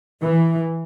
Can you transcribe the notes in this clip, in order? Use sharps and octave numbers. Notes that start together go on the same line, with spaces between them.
E3